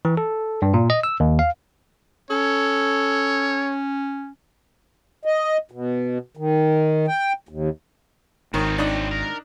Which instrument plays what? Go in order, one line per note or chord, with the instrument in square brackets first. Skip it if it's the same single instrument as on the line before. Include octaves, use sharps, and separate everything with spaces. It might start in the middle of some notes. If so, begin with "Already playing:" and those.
[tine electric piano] E3
A4
G2
A#2
D#5
E6
D#2
F5
[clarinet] C#4 [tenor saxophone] A4 [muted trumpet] C#5
[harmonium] D#5
B2
D#3
G5
D#2
[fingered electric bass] G#1 [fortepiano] D#3 [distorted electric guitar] C4 C#5
[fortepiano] D4 D#4
[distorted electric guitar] A#4